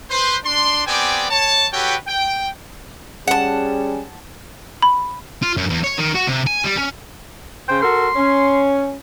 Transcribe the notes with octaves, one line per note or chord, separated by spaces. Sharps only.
B4 C5 C6
D4 C6
B3 C4 G4 D5 G5 G#5
C#5 A5
F#4 G4 A4 B4 C#5 G5
G5
G3 C#4 G#4 F#5 A5
B5
F4
F#2
E2
C#5
D#3
F#4
C3
G#5
G3
C#4
C#3 C5 G5
F#4 A4 A#4 C6
C#4